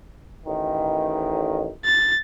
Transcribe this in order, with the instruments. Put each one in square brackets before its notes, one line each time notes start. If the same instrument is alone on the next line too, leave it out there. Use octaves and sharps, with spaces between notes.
[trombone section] A1 D#3
[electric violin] A6